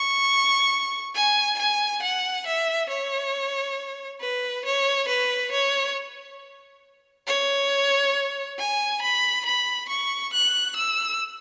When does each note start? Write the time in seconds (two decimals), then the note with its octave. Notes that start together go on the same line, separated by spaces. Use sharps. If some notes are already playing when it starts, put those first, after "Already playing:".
Already playing: C#6
1.15 G#5
1.59 G#5
2.03 F#5
2.47 E5
2.90 C#5
4.21 B4
4.65 C#5
5.09 B4
5.52 C#5
7.27 C#5
8.58 G#5
9.02 B5
9.46 B5
9.89 C#6
10.33 F#6
10.77 E6